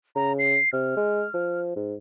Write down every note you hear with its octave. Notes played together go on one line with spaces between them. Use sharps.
C#3 A#5
C7
C3 F6
G#3
F3
G#2